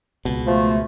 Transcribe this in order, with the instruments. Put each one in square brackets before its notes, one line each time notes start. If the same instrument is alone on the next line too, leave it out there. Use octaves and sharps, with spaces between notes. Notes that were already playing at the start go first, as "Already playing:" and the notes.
[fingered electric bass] C#2 B2
[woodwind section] F3 A3